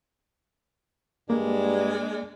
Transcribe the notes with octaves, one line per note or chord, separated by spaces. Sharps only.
G2 G#3 A#3 D4